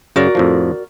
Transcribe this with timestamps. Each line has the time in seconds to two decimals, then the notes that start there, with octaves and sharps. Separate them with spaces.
0.16 F#2 C#3 F#4 A#4 D5
0.35 F2 A2 F3